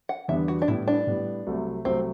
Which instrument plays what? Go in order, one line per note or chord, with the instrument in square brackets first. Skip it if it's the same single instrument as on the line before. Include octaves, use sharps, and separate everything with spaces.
[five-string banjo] F#5
[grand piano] E2 D3 G3 B3 D4 [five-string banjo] E5
[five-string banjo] F#4
D4
[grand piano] A2 G3 B3 [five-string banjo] E4
[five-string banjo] D4
[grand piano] A2 G3 B3
C2 C3 F#3 A3
[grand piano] C2 C3 F#3 A3 [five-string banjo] C4